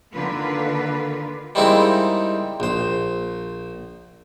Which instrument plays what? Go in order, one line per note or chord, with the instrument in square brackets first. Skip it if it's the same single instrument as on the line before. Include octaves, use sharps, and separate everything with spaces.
[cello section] D3 D#3 A#3 F4 A#4 B4
[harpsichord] G3 G#3 A#3 C4 D#4 E4
A#1 C5